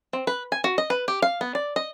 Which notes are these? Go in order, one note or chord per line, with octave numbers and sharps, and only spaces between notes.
C4
B4
G#5
F#4
D#5
B4
G4
F5
B3
D5
D#5